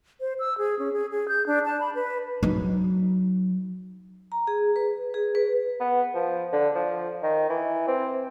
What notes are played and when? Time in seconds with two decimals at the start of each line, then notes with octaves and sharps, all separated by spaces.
0.20 C5
0.39 E6
0.58 G#4
0.79 C#4
0.93 G#4
1.11 G#4
1.28 G6
1.47 D4
1.66 A5
1.80 B5
1.95 B4
2.43 F#3 D#4
4.32 A#5
4.47 G#4
4.76 B4
5.14 G#4
5.35 B4
5.80 B3
6.14 F3
6.53 D3
6.74 F3
7.23 D#3
7.50 E3
7.87 C4